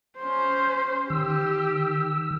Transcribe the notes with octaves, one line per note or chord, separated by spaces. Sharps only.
C#4 C5
D#3 G4 E6